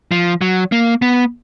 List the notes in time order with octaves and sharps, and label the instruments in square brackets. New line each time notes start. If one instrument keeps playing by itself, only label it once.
[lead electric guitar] F3
F#3
A#3
B3